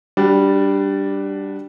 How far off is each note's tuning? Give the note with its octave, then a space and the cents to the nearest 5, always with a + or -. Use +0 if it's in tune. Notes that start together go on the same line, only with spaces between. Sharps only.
G3 +0 D4 +0 F#4 +25